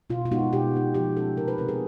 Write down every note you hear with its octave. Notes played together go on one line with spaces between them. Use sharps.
B2 F4
F4
G#3 B3 D#4 F#4
B2 G4
G#3 B3 D#4
F3 G4
G#3 C#4 A4
C3 A#4
B4
E3 G#3 C4 A#4
G#4